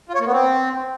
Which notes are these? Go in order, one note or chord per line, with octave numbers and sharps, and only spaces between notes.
F4
C#5
A#3
B3
C4